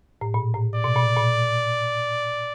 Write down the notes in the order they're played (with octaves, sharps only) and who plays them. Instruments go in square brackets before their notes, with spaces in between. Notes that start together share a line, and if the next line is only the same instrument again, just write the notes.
[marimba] A2
A#2
A2
[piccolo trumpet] D5
[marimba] B2
A#2
A#2